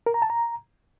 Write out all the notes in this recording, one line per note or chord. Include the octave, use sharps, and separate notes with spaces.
A#4
A#5
A5
A#5